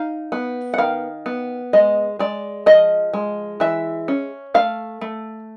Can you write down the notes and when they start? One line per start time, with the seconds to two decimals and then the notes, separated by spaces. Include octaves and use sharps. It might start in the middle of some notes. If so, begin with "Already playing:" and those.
Already playing: D#4 F5
0.32 B3
0.74 F#5
0.78 D#3 F5
1.26 B3
1.73 G#3 D#5
2.19 G#3 D5
2.66 F3 D#5
3.13 G#3
3.60 E3 E5
4.08 C#4
4.54 A3 F5
5.01 A3